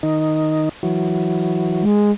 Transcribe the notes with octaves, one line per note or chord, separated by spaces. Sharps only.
D#3 D#4
E3 F#3
G#3